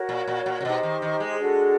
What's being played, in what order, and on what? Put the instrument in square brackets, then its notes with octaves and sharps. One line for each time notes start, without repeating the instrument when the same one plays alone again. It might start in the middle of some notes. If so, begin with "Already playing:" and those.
Already playing: [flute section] F#4 A#4 C#5
[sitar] A#2
A#2
A#2
C3
[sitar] B2 [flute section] D#4 G4 C5 D#5
[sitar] D#3
D#3
G#3
[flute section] D4 F#4 A4